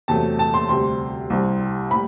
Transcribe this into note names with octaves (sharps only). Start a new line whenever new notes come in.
E2 C3 F#3 A3 A5
A5
C6
D2 C3 G3 C6
C2 C3 G3
A2 G3 B5